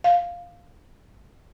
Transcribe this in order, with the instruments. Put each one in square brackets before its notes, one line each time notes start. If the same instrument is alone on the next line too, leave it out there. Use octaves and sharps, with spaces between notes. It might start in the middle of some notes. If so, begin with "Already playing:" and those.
[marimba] F5